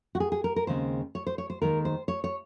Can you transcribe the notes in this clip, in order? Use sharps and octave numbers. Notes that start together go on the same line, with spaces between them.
F#4
G#4
G#4
A#4
A#4
D#2 C#3 G#3 C4 C5
C#5
C5
C#5
C5
D#2 D#3 G#3 A#4
C5
C#5
C#5